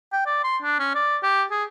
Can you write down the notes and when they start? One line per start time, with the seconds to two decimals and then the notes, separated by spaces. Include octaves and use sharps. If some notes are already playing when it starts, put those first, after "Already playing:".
0.13 G5
0.26 D5
0.44 C6
0.62 D4
0.79 C#4
0.95 D5
1.23 G4
1.51 G#4